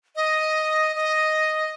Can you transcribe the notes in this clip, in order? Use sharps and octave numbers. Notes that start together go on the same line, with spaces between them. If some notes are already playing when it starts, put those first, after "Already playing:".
D#5
D#5